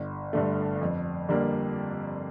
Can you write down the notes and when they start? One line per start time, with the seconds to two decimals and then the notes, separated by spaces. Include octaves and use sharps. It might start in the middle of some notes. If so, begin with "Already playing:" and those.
Already playing: G1
0.33 G2 D3 A3
0.81 F2
1.29 D3 G3 A#3